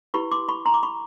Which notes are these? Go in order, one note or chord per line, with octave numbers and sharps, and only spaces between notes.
E4 G4 B4 B5 C#6
C6 D6
B5 C#6
A#5 C6
D6
B5 C#6